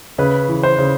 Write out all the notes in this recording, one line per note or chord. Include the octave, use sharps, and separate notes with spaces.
C#3 B4
E3
C5
C#3